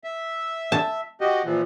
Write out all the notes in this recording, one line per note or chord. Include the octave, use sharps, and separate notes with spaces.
E5
A5
F#4 G4 D#5
A#2 E3 F3